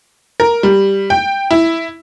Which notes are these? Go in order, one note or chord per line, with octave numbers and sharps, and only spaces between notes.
A#4
G3
G5
E4